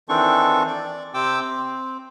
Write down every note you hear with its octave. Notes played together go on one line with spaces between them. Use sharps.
D#3 E3 C4 D4 A4 C#6
D5
C3 C4 G5 D6 E6
C4